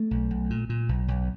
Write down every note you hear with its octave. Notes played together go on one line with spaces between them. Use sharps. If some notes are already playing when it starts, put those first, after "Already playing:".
Already playing: A3
B1
B1
A#2
A#2
B1
B1